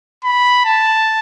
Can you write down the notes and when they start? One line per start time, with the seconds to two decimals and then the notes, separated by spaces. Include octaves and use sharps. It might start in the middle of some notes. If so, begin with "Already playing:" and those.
0.24 B5
0.65 A5